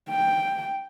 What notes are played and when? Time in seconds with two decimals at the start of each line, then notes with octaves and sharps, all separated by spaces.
0.10 G5